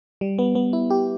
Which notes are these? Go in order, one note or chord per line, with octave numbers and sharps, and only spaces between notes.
G3
B3
B3
E4
G4